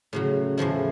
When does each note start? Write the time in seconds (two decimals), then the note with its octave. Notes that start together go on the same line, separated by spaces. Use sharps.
0.13 A2 C#3 F#3
0.58 E2 A2 F3 E4